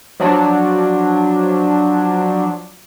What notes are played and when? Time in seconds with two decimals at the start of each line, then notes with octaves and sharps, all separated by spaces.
0.20 F3 F#3 D4